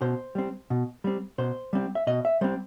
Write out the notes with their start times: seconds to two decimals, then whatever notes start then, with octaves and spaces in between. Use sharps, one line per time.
0.01 B2 C5
0.35 G3 C4
0.70 B2
1.04 G3 C4
1.38 B2 C5
1.73 G3 C4
1.95 E5
2.07 B2 D#5
2.25 E5
2.41 G3 C4 C5